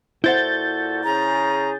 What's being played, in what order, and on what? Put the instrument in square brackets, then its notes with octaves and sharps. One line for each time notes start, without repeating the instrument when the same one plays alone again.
[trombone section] A#2 F#4 A4 [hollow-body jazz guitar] E4 C5 F#5 [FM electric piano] G6 A6
[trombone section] C#3 G#4 [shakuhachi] A#5